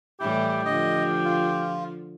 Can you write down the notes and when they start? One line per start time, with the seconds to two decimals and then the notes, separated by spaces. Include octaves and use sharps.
0.20 A2 E3 G3 E4 G4
0.65 D3 F3 D#5
1.25 F4